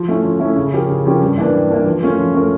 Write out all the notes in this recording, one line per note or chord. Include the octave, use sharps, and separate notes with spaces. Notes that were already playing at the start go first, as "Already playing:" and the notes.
Already playing: F3
A3 C#4 E4
F3
A3 C#4 E4
C#3
F3 C#4 G4 A#4
C#3
F3 C#4 G4 A#4
G2
E3 A#3 D4
G2
E3 A#3 D4
F3
A3 C#4 F4 A#4
F3
A3 C#4 F4 A#4